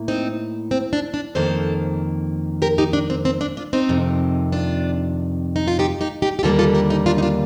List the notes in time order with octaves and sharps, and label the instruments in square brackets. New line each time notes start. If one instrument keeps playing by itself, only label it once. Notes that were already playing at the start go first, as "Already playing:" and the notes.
Already playing: [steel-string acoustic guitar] A2 A#3
C4 D#4
C4
D4
D4
F2 D#3 A#3 A4 C5
G4 A#4
D#4 G4
D4
C4
C4
D4
D4 F4
C4 D#4
F2 C3 D#3
D4 F4
D#4
F4
D#4 G4
D#4 G4
D#4 G4
G4
D#2 D3 G3 A#3 F4 A4
F4 A4
G4 A#4
D#4 G4
D4 F4
D#4
D4 F4